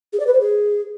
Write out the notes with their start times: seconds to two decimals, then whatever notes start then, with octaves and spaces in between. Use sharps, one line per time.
0.13 G#4
0.20 D5
0.26 B4
0.33 C5
0.40 G#4